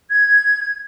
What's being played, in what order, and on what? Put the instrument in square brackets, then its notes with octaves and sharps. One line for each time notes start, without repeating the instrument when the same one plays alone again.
[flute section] G#6